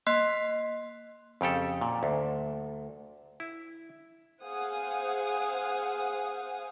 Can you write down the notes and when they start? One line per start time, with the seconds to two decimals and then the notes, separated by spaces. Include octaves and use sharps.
0.07 A#3 D#5 C6 F#6 B6 C7
1.41 F2 C#3 G4 A4
1.81 A#2
2.03 D2
3.40 E4
4.42 G#4 C5 F5 F#5 G#5 D#6